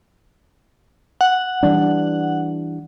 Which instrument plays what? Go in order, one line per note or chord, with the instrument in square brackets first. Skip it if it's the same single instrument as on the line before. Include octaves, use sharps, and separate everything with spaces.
[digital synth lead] F#5
[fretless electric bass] E3 G3 D4